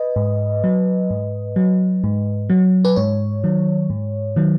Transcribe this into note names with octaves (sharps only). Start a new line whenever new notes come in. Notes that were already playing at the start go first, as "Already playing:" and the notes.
Already playing: B4 D#5
G#2
F#3
G#2
F#3
G#2
F#3
B4
G#2 C#5
D#3 F#3
G#2
D#3 F#3